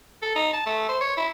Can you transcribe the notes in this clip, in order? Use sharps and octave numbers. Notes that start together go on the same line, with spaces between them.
A4
D#4
A5
A3
C5
C#5
E4